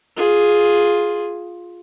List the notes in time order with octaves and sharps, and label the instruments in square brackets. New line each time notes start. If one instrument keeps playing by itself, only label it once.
[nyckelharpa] F4 G#4